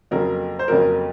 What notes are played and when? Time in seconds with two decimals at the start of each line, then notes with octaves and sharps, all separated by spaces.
0.11 F2 C#3 F#3 A#3 A#4
0.59 C5
0.68 F2 C#3 F#3 A#3 A#4